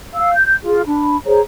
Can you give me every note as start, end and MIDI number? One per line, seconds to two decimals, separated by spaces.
0.15 0.33 77
0.15 0.33 88
0.33 0.56 91
0.64 0.81 65
0.64 0.81 68
0.86 1.16 62
0.86 1.16 83
1.26 1.40 68
1.26 1.40 72
1.26 1.40 73
1.26 1.40 82